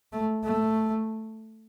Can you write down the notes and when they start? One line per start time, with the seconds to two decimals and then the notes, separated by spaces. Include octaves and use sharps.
0.13 A3
0.44 A3